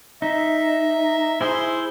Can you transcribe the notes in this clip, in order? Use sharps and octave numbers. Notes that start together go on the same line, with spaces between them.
D#4 E5
E4 G#4 C5 C6